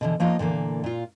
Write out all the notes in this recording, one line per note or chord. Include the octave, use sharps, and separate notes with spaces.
B2 D3 E3
F3 A#3 D#4 F4 D#5
A#2 D3 E3 A#3
A#2 F4